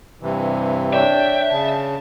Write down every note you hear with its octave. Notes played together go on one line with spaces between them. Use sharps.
G2 C3 E3
D4 C#5 D5 E5 G5
C#3 A5